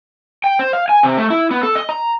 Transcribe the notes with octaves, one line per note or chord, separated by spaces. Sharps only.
G5
C5
F5
G#5
C3
A3
E4
B3
A4
D#5
A#5